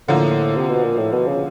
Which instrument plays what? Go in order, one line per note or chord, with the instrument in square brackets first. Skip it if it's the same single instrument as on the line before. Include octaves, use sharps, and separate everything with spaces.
[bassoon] A2 [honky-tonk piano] D3 F3 A#3
[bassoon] C3
B2
A#2
A2
B2
C#3